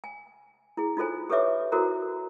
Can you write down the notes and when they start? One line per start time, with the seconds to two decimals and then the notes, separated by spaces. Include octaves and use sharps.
0.04 G#5
0.77 E4 G#4
0.97 D#4 F4 A4 C5 G#5
1.30 G4 A4 B4 C#5 E5 D6
1.72 E4 F#4 A4 A#4 C5 A#5